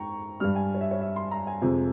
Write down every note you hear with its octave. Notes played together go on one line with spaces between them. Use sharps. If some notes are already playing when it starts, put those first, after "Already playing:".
Already playing: G#2 G5 A#5 C#6
G2 G3 F6
G#5
C#5
E5
C#5
E5
C6
A#5
G#5
F2 C3 F3 G#3